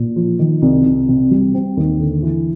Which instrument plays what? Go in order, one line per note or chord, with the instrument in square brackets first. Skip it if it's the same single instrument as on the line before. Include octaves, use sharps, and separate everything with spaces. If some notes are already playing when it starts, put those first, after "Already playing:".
Already playing: [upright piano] A#2
F3
D#3
C2
C2
C3
G3
C4
D#2
D3
E3